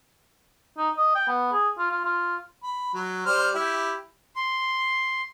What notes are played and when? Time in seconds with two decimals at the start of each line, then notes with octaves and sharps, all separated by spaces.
0.77 D#4
0.97 D#5
1.15 G5
1.27 B3
1.52 G#4
1.78 F4
1.91 F4
2.05 F4
2.63 B5
2.94 F#3
3.26 G3 C5 F6
3.54 E4 G4
4.36 C6